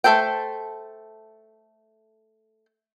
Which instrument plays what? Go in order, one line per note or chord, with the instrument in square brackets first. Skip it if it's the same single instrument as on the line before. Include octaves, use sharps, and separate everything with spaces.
[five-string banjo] A3 G#4 A4 C5 G5